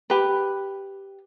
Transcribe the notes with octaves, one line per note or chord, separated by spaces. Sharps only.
G4 B4